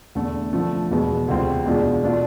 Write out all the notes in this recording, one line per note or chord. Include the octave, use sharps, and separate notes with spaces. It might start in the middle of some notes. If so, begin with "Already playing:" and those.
E2 D3 A3
D3 F3 A3
E2 B2 G#3 B3
D2 C3 G#3 C4 F4
E2 B2 G#3 D4 F4
B2 A3 D4 F4